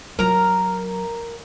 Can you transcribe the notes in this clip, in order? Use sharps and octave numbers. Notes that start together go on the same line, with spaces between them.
F#3 A#4 A#5